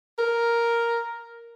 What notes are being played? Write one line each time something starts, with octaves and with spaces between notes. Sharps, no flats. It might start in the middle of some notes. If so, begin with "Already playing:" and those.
A#4